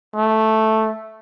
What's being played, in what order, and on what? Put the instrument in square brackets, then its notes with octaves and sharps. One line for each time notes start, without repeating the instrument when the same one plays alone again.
[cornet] A3